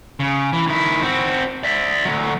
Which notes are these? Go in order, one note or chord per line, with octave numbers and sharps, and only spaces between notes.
C#3
E3
D#3 E4
C4 F#4
D5 E5
D2 F#3